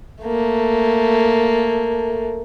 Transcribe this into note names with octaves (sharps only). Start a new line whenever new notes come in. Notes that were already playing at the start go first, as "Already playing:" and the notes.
A3 A#3